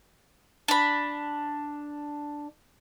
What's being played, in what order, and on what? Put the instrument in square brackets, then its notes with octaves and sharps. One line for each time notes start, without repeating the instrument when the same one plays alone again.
[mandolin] D4 B5